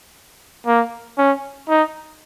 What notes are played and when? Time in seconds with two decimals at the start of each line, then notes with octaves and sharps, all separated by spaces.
0.67 A#3
1.18 C#4
1.68 D#4